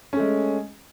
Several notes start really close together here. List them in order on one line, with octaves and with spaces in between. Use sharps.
C#4 A3 G#3